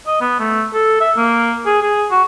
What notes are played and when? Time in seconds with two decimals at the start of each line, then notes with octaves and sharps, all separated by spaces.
0.07 D#5
0.21 B3
0.39 A3
0.74 A4
1.01 E5
1.17 A#3
1.66 G#4
1.82 G#4
2.11 F#4